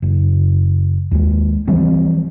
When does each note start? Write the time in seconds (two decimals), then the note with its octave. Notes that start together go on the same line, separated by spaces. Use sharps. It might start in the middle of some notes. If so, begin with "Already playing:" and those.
0.02 F#1
1.11 D#2 G#3
1.67 E3 F3 G3 C4